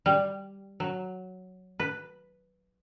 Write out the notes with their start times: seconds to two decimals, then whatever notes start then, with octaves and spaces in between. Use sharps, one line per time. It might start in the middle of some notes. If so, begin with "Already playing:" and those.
0.06 G3
0.80 F#3
1.80 B4